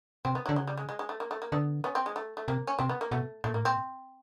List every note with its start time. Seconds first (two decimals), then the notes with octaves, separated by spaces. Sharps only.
0.25 C3 C4
0.35 B3
0.46 F#3
0.49 D3
0.56 C#3 F#3
0.67 G3
0.77 G#3
0.89 G#3
0.99 G#3
1.09 A3
1.20 A#3
1.31 A3
1.42 A#3
1.52 D3 B3
1.84 B3 C#4
1.95 C4
2.06 G#3
2.16 A3
2.37 A3
2.48 C3 A#3
2.67 C#4
2.79 C3 C4
2.89 B3
3.01 A#3
3.11 B2 A3
3.44 A#2 A3
3.53 A2 A#3
3.63 A#2 C4